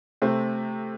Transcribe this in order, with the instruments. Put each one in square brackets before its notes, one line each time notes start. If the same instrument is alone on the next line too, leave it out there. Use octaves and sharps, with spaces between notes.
[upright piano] C3 A3 C4